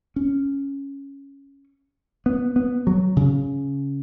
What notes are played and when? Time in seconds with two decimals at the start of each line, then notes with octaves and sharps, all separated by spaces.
0.16 C#4
2.26 B3
2.56 B3
2.87 F#3
3.16 C#3